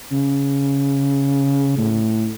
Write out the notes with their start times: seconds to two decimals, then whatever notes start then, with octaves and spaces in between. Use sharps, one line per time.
0.12 C#3
1.78 A2